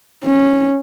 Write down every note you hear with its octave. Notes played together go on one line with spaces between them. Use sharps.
C#4